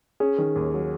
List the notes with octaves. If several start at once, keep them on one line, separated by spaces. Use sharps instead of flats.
C#4 G#4
D#3
D#2
F#3